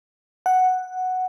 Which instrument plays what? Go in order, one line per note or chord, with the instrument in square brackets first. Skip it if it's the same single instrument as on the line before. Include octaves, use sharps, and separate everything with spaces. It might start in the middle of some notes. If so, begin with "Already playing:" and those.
[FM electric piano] F#5